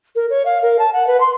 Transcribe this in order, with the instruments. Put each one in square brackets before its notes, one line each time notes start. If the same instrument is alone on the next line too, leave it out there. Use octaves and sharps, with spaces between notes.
[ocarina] A#4
C#5
F5
A#4
A5
F#5
B4
C6